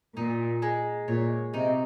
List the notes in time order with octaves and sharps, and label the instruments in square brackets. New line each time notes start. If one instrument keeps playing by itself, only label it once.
[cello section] A#2 [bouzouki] D#4
[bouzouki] G#3
[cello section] A#2 [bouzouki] C#5
[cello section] C3 [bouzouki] D#4